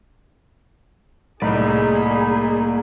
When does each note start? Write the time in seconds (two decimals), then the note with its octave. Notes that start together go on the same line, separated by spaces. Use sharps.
1.42 C2 A2 A#3 D#4 G#4 D5 B5